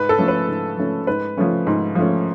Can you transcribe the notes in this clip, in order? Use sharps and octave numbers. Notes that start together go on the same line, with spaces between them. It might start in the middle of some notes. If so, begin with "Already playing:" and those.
Already playing: G#2 B4
A4
F3 A3 C#4
B4
G#2
F3 A3 C#4
G#2 B4
F3 A3 C#4
G#2
F3 A3 C#4